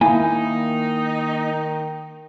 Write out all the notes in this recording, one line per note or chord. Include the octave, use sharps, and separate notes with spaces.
D#3 A#3 D#4 E4 F5 G#5